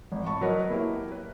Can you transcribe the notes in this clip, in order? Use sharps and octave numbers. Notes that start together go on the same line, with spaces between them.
G#1
A5 B5 C#6
F#3 A#4 B4 D#5
A#3 E4 G4
B4